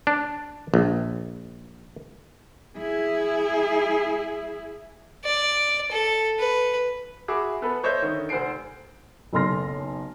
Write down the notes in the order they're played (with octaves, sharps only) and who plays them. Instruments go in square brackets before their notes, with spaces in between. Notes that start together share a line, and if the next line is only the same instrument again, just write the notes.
[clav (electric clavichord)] D4
A#1
[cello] E4 G#4
[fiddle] D5
A4
B4
[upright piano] F#4 G#4 E5 B5 D6
B3 A4 B4
C5 C#5 D#5 E5 G6
D3 D#3
F1 C5 F#5 G#5 C7 D7
F#1 B1 A4 C6 F6 A#6